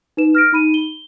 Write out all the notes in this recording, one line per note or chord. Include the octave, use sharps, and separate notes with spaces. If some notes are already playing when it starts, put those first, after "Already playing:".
D#4 B4 E7
F6 A#6 D7
D#4 B5 D#7
G7